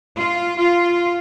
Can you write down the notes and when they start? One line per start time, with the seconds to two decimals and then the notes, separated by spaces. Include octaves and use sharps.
0.17 F4
0.56 F4